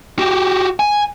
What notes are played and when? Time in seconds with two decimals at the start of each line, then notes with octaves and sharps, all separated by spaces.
0.19 F#4 G4
0.80 G#5